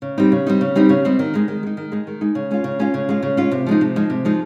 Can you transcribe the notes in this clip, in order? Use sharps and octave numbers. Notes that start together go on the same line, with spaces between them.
C#3
G3 C4 D#4
C#3
G3 C4 D#4
C#3
G3 C4 D#4
C#3
G3 C4 D#4
D#3
G#3 D#4
D#3
G#3 D#4
D#3
G#3 D#4
D#3
G#3 D#4
C#3
G#3 C#4 F4
C#3
G#3 C#4 F4
C#3
G#3 C#4 F4
C#3
G#3 C#4 F4
C3
F3 G#3 D#4
C3
F3 G#3 D#4
C3
F3 G#3 D#4